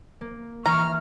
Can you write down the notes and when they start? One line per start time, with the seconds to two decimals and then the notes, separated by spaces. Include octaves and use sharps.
0.21 A#3
0.66 E3 A#5 C#6 F6